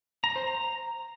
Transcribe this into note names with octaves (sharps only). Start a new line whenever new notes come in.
A#5
C5
A#5